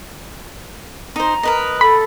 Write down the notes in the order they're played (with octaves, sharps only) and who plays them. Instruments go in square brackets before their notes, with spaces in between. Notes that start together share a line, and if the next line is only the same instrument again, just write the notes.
[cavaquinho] D#4 C5 [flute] A#5
[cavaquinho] A#4 B4 D#5
[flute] A4 [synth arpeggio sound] B5